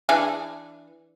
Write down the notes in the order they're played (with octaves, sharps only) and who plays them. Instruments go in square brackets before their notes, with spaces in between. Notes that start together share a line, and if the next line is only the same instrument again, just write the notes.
[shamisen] E3 D4 G#4